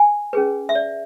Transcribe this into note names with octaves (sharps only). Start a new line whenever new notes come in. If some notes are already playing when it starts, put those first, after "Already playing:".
Already playing: G#5
C#4 G#4 B4
E5
D5